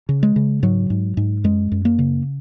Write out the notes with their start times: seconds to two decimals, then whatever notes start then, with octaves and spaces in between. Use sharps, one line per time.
0.09 C#3
0.23 G#3
0.36 C#3
0.63 G#2 F#3
0.90 G#2
1.17 G#2
1.44 F#2 G#3
1.72 F#2
1.85 A#3
1.99 C#3